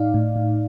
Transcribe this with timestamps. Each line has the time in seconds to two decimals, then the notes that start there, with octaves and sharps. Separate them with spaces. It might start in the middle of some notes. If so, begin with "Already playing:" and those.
Already playing: A2 D#4 D5 F5
0.14 A2
0.36 A2